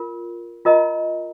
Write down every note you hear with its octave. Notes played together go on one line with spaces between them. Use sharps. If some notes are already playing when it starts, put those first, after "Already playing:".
Already playing: F4 A#4
F4 A#4 D#5 A#5